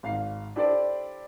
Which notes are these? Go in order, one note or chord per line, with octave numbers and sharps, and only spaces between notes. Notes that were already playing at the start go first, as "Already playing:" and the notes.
G#1 F5 C7
D4 E4 G4 A4 C5 D5